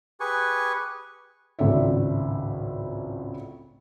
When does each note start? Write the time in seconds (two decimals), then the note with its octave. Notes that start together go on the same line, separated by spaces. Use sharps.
0.20 G4 G#4 B4 G#5 C#6
1.59 G#1 C#2 A2 D5 E5